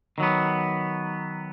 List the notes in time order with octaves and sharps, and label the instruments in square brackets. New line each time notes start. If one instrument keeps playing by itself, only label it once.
[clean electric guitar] D#3 F#3 B3